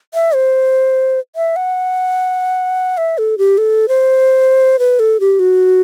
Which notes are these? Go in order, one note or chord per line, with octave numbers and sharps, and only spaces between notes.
E5
C5
E5
F#5
E5
A4
G4
A4
C5
B4
A4
G4
F#4